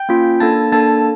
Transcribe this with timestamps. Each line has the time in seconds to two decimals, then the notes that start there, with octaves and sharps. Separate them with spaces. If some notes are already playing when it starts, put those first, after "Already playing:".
Already playing: G5 G6
0.09 A#3 C#4 F4
0.40 A#3 D4 A4 A5 A6
0.72 A#3 D4 A4 A5 A6